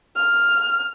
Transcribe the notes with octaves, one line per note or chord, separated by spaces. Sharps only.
F6